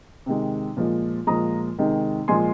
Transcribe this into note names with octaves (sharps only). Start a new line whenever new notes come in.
C3 D#3 G#3
A#2 F3 G#3
A#2 F3 G#3 A#5 D#6
C3 D#3 G#3
A#2 F3 G#3 G#5 C6